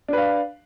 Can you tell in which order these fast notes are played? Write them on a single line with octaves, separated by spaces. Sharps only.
D4 B4 F5